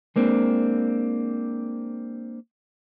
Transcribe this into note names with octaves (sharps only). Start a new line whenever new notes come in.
G#3 A#3 C4 D4